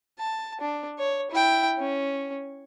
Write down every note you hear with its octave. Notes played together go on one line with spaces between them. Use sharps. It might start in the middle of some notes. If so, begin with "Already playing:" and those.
A5
D4
C#5
E4 G5
C#4